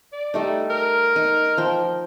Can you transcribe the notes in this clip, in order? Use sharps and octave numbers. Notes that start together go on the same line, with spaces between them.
D5
G3 A3 D#4
A#4
D#4
F3 G5